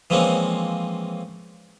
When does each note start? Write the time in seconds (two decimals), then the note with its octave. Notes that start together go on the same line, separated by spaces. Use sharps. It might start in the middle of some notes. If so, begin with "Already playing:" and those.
0.10 E3 F3 G#3 A#3 C4 C#4